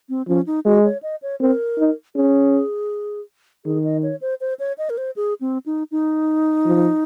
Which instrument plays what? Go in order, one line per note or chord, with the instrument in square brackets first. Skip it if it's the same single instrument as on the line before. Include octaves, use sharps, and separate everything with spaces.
[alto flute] C4
[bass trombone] F3 [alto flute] C#4
[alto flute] D#4
[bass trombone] G#3 [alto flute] F#4
[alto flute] C#5
D#5
C#5
[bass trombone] C4 [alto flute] A#4
[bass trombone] D#4
[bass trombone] C#4 [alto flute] G#4
[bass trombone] D#3 [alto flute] G#4
[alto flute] D#5
C#5
C5
C5
C#5
D#5
A#4
C5
G#4
C4
D#4
D#4
[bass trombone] F3